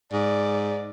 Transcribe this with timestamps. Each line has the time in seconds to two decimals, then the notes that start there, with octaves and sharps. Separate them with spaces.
0.12 G#2 D5